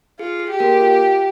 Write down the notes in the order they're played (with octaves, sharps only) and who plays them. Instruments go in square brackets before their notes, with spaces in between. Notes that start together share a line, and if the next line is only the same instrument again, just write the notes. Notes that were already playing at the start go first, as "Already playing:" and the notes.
[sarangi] F4 [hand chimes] G#4
[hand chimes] G#4
[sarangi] G4
[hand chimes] A#3 A#4
F4 F5